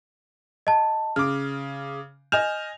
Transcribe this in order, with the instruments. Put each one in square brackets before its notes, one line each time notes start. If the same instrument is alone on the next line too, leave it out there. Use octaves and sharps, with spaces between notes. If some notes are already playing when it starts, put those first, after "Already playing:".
[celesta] D#5 A5
[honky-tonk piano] C#3 D6 [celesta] F6
[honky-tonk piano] D#5 G#5 F7 [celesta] F6 G6 E7